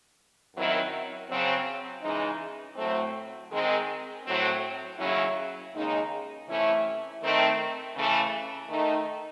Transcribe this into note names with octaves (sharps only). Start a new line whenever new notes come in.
F#2 D#3 F#3 C4 E4
C#3 F#3 C4
C#3 E3 G#3 D#4
A2 F#3 A3 C4
D#3 G#3 C4
A2 F#3 C4
D#2 C#3 F#3 C#4 E4
D#2 C#3 G#3 D#4
C3 E3 A3 C#4 E4
D#3 A3 C4
C#3 E3 A3
D#3 A3 D#4